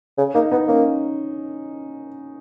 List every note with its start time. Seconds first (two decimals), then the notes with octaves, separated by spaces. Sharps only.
0.18 C#3
0.35 A#3 D#4
0.51 B3 D#4
0.68 A#3 C#4